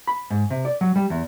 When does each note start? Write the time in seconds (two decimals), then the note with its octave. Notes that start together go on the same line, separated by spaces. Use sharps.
0.07 B5
0.30 G#2
0.50 C3
0.65 D5
0.81 F#3
0.96 G3
1.10 E2